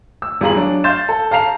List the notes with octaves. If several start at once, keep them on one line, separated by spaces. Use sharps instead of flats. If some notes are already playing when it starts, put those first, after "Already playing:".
E6
E2 G3 F4 G#4 A#5 F#7
F#3 D4
F5 C6 G6 A6 E7
A4
F5 A5 A#5 C7 F7